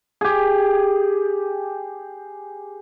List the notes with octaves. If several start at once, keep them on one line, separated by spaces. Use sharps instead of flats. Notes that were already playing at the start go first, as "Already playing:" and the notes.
G4 G#4